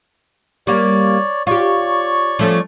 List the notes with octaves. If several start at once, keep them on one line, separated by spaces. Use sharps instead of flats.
G3 A#3 C#5 D5
F4 G4 C#5 D5 C#6
F3 A3 C#4